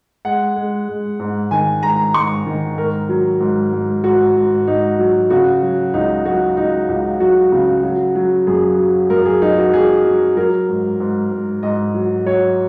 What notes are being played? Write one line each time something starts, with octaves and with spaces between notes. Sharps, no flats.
G#3 F#5
G#3
G#3
G#2
D#3 G#5
G#2 A#5
G#2 C#6
D#3
G#2 A#4
F#3
G#2
G#2
G#2 F#4
G#2
G#2 D#4
F#3
C#3 F#4
F#3
C#2 D#4
F#3 F#4
C#2 D#4
C#2
F#3 F#4
C#3
F#3
F#3
F#2 G#4
F#3
F#2 A#4
G#4
F#3 D#4
F#4
F#3 G#4
F#3
F#3 A#4
G#2
G#2
G#2
G#2 D#5
F#3
F#3 C#5